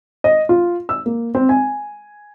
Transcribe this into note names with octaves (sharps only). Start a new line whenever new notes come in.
D#5
F4
E6
A#3
C4
G#5